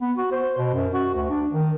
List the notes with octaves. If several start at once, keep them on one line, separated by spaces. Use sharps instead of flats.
B3
F#4
C5
B2
F#2
F#4
D2
D4
D#3